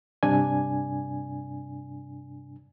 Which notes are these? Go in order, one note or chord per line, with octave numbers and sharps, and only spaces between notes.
G2 C3 D4 D5 G#5